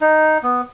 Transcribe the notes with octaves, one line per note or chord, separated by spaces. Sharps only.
D#4
B3